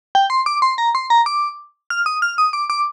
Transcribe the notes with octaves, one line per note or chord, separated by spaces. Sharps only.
G5
C6
D6
C6
A#5
C6
A#5
D6
F6
D#6
F6
D#6
D6
D6